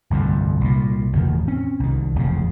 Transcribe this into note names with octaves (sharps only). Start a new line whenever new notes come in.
G1 C2 F2 A2
C2 A#2
F#1 E2 A2 D#3
C4 C#4
C2 D#3
E1 F2 A2 C#3